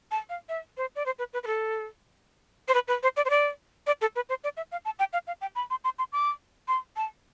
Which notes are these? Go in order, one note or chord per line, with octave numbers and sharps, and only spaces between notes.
A5
F5
E5
C5
D5
C5
B4
B4
B4
A4
C5
B4
B4
C5
D5
C5
D5
D5
A4
B4
C5
D5
E5
F5
A5
G5
F5
F5
G5
B5
C6
C6
C6
D6
C6
A5